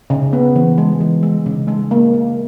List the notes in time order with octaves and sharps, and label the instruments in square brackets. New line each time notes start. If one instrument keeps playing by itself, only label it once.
[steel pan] C#3
B3
E3
G#3
E3
G#3
C#3
G#3
A#3
A#3